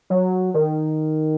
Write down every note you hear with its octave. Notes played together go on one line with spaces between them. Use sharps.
F#3
D#3